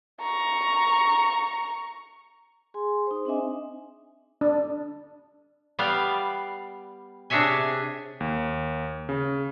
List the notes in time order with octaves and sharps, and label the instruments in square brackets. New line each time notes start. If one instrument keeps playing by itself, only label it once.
[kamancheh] A#5 C#6
[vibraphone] G#4 G#5 C6
D#4 C5
C4 D4 D#5 E5 G#5
[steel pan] D4
[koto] G3 B3 D5 F5
C3 D4 G#4 C#5 E5 G#5
[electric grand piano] D#2
C#3